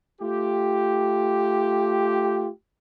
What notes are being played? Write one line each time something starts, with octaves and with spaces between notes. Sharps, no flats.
A3 F4 G4